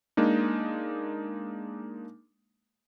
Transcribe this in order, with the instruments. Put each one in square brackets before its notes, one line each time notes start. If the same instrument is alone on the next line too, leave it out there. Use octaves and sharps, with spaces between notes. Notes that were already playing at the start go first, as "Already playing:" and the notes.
[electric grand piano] G#3 A#3 D4 D#4